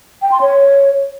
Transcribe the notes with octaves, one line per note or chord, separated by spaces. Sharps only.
G5
C6
C#5